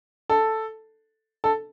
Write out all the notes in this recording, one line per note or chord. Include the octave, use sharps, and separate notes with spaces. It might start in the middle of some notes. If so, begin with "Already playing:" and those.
A4
A4